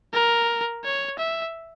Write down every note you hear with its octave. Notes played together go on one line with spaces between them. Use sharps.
A#4
C#5
E5